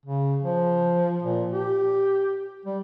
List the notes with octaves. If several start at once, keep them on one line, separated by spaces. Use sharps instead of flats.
C#3
F3
A#2
G4
G3